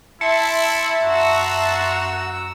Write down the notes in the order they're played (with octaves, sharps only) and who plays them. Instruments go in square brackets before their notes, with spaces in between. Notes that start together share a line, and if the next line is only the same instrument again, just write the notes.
[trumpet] E4 [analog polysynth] E5 A5 C6 [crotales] C#7
[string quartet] F#2 A#5 E6 [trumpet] F#4